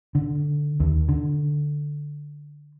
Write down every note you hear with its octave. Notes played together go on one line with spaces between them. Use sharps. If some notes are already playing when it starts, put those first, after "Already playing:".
D3
D#2
D3